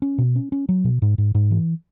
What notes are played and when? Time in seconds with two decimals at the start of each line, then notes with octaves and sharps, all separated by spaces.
0.02 C#4
0.18 B2
0.36 C#4
0.52 C#4
0.69 F#3
0.84 B2
1.02 G#2
1.18 G#2
1.35 G#2
1.51 E3